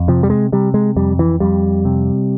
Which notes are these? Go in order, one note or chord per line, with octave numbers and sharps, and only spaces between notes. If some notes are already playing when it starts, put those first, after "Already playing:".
Already playing: F2
C3 F3
G3
G#3
C3 G3
G#3
F2 G3
E3
F2 G3
C3